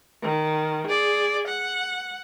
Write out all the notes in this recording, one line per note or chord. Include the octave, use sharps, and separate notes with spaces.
D#3
G#4 D5
F#5